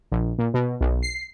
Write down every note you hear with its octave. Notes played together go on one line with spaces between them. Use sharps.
A#1
A#2
B2
B1
C7